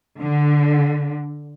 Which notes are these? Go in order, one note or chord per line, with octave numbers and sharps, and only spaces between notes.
D3